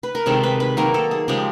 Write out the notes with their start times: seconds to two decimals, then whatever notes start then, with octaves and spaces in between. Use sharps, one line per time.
0.03 B4
0.15 A#4
0.26 C3 D#3 G#3 A4
0.43 B4
0.60 B4
0.77 D#3 F#3 A#3 A#4
0.94 A4
1.11 G#4
1.28 C#3 F3 G#3 G4